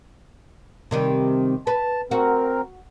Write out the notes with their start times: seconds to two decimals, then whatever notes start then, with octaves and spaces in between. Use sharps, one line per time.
0.91 C3 D#3 G3
1.67 B4 A5
2.11 C4 F#4 A#4